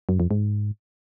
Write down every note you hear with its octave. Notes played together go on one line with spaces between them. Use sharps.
F#2
F2
G#2